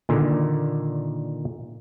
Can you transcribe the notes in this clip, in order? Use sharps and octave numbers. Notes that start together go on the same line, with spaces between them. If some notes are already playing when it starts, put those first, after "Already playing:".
A#2 D3 D#3